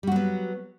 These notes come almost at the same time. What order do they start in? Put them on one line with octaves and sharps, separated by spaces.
G3 F#4 F#3 B3